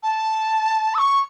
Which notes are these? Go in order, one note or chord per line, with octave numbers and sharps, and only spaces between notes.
A5
E6
C#6